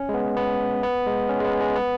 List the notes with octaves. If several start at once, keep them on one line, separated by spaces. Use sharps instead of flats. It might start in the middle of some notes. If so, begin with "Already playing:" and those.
Already playing: C#4
G#3
B3
B3
B3
G#3
C#4
G#3
B3
G#3
B3